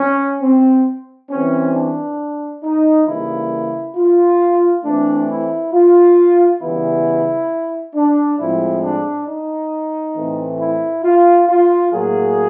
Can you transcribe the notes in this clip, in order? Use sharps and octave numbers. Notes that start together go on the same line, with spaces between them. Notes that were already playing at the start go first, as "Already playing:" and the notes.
Already playing: C#4
C4
E3 G3 C4 C#4
D4
D#4
C#3 E3 G3 A#3 E4
F4
E3 A3 C4 D4
E4
F4
C#3 E3 G3 B3 E4
D4
A2 F3 G#3 C4 E4
D4
D#4
A2 E3 A3 C4
E4
F4
F4
A2 F#3 A#3 G#4